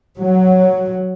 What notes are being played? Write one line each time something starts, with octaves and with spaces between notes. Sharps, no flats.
F#3